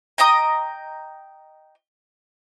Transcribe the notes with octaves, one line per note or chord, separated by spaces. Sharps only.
D#5 G5 A#5 D#6